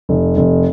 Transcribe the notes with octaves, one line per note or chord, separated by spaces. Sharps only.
F1
F1